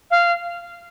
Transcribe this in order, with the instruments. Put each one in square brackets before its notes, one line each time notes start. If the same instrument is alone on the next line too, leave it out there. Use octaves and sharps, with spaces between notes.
[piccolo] F5